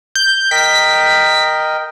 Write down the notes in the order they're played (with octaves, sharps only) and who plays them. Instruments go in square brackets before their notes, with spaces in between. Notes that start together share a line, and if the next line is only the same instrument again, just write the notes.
[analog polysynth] G6
[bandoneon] A#4 D#5 G5 [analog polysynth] B6